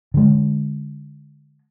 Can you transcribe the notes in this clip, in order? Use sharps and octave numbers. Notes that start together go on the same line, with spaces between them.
D3 G#3